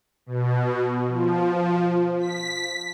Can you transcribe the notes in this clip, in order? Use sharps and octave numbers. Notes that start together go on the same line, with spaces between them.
B2
F3
B6